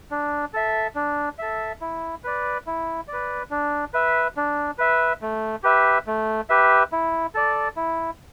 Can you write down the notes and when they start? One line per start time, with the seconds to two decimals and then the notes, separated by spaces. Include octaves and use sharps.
0.11 D4
0.54 A4 E5
0.95 D4
1.39 A4 E5
1.81 E4
2.24 B4 D5
2.67 E4
3.08 B4 D5
3.51 D4
3.94 B4 E5
4.37 D4
4.78 B4 E5
5.22 A3
5.63 G4 B4 E5
6.07 A3
6.50 G4 B4 E5
6.92 E4
7.35 A4 D5
7.76 E4